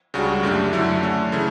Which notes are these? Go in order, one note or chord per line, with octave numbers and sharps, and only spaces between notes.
C#2 C#3 G3 D4 F#4
F#2 D3 A3 D4 G4
F#2 D3 F#3 A3 E4
D3 A3 C#4
C#3 E3 A3